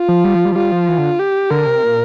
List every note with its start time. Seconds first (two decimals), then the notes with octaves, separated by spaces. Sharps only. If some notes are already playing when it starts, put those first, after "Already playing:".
Already playing: F4
0.08 F3
0.24 G3
0.35 F3
0.45 G3
0.52 F3
0.56 G3 F4
0.72 F3
0.88 E3
0.98 D3
1.19 G4
1.50 D3 A#4
1.66 C3
1.83 A#2